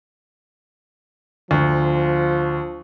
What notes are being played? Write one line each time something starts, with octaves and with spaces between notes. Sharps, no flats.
D2 F3